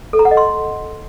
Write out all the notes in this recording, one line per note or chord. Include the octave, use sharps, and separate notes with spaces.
A4
A#5
F#5
D#5
C6